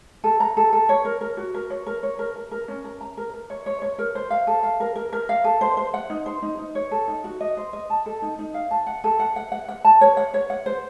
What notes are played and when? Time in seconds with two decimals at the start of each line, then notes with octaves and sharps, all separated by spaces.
0.24 A4
0.40 A#5
0.57 A4
0.73 A4
0.89 C#5
1.05 A#4
1.21 A#4
1.37 F#4
1.54 A#4
1.70 C#5
1.86 A#4
2.03 C#5
2.19 A#4
2.36 A#4
2.51 A#4
2.68 C#4
2.84 A#4
3.01 A#5
3.17 A#4
3.34 A#4
3.50 C#5
3.66 C#5
3.82 C#5
3.99 A#4
4.15 C5
4.30 F5
4.47 A4
4.63 F5
4.80 A#4
4.96 A#4
5.13 A#4
5.29 F5
5.44 A4
5.61 C5
5.77 C5
5.94 F#5
6.10 D#4
6.26 C5
6.42 D#4
6.58 D#4
6.75 C#5
6.91 A4
7.08 D#4
7.24 F#4
7.41 D#5
7.57 C5
7.73 D#5
7.90 A5
8.06 A4
8.22 D#4
8.39 D#4
8.54 F5
8.71 A5
8.86 F#5
9.04 A4
9.19 F#5
9.36 F#5
9.52 F#5
9.68 F#5
9.85 A5
10.01 C#5
10.17 F#5
10.34 C#5
10.50 F#5
10.66 C5